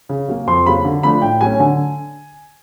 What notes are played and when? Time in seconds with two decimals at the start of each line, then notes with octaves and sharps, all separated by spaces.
0.09 C#3
0.28 F#3 A#3
0.47 F2 C6
0.66 C#3 F#3 A#3 B5
0.85 D3
1.03 F3 A3 D4 B5
1.22 A2 G5
1.41 F#3 A3 C#4 G#5
1.60 D3 G#5